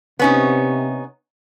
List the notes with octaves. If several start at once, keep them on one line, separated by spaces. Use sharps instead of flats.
C3 B3 C#4 D#4